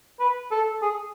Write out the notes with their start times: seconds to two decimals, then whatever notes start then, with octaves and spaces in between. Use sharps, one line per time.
0.20 B4
0.51 A4
0.82 G#4